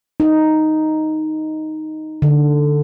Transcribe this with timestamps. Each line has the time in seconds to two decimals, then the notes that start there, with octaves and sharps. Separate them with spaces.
0.20 D#4
2.22 D3